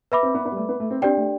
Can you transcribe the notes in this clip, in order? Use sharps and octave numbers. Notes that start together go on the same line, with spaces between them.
B4 E5 B5 D6
C4
B3
B3
G3
A3
B3
A3
C4
C4 D4 G4 D5 G5
A3